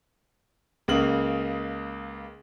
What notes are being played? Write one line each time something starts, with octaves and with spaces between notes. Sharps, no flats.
C#2 C#3 A#3 F#7